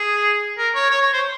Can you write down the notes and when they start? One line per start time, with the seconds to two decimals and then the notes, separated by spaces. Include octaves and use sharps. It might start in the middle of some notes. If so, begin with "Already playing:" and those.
Already playing: G#4
0.58 A#4
0.75 C#5
0.90 C#5
1.02 C#5
1.13 C5